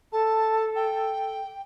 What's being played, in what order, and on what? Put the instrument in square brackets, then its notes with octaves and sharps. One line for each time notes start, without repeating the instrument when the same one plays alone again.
[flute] A4 [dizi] A5
[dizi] G5